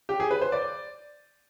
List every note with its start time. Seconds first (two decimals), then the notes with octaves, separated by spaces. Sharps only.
0.09 G4
0.20 G#4
0.31 B4
0.41 C5
0.52 D5